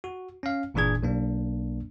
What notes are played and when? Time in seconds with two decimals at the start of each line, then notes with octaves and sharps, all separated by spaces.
0.04 F#4
0.43 C#4 F5
0.74 G1 A#2 E3 D4 G#4 G#6
1.03 B1 A#3 D4